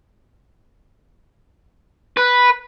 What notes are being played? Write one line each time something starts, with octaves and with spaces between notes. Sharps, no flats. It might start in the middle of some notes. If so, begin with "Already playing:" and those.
B4